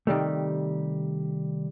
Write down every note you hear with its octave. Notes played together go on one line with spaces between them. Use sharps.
C3 D#3 G3 A3